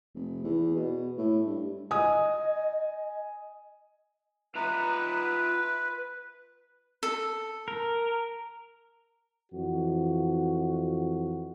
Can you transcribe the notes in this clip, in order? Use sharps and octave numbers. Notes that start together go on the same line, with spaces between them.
F1
E2
B2
A2
G2
D#5 G#5 D#6
F4 B4 E5 A#5
A4
A#4
F2 E3 F#4